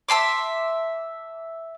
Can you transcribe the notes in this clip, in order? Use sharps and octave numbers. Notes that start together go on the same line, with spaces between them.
E5 A5 C6 D6